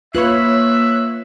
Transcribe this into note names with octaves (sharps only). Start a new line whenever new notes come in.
A#3 F4 B4 C#5 E5 F#6